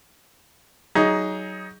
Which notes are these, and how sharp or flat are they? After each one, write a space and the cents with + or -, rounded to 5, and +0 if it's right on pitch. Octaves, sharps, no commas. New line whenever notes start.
F#3 +25 D#4 +20 G#4 +0